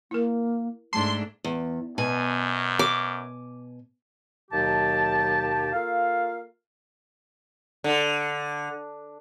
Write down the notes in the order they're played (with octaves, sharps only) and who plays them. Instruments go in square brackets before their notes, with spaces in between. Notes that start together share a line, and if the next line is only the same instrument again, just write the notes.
[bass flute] A#3 [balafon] E4 A#4
[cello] G#2 D4 [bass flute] A3 [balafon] A5 [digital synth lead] C6
[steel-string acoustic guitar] E2
[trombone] F#2 [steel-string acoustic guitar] B2 G#5
[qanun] D6
[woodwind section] D#2 B2 F#3 G4 A5
A#3 F4 A4 F5
[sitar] D3